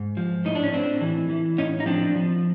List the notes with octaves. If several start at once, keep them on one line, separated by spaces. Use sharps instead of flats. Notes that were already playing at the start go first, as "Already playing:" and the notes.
Already playing: G#2
F3
A2 D#4
D4
C#4
A2 C4 D4
E3
E3
A2 C#4 D#4
D#4
F3 C4 D4
F3